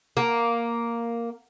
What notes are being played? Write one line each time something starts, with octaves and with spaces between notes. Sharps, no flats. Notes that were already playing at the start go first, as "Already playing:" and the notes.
A#3